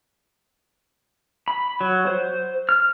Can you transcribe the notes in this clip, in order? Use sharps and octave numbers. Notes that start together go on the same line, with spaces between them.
B5
F#3
C5
F6